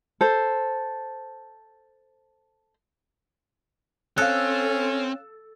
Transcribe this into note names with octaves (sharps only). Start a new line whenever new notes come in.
A4 C5
C4 C#4 A4 F5 F#6